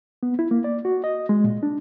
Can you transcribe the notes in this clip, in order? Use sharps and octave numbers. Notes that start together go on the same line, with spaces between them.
B3
E4
A#3
D5
F#4
D#5
G#3
A#2
D4